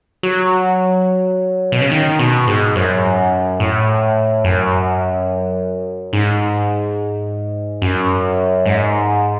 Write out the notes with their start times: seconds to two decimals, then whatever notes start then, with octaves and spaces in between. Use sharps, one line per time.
0.23 F#3
1.72 B2
1.81 C#3
1.91 D#3
2.19 B2
2.47 G#2
2.76 F#2
3.60 A2
4.44 F#2
6.13 G#2
7.82 F#2
8.66 G#2